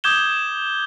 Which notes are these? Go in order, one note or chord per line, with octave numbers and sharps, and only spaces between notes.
D6 D#6 G6 G#6 E7 G7